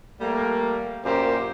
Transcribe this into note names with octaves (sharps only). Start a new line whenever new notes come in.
G3 A3 A#3
F#2 A#2 A#3 G4 C5